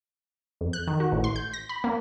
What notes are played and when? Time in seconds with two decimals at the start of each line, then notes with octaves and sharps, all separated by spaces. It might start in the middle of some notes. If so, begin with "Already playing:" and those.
0.61 F2
0.73 F#6
0.87 D#3
1.00 F#4
1.12 A1
1.24 C6
1.36 G6
1.53 A#6
1.69 B5
1.84 A#3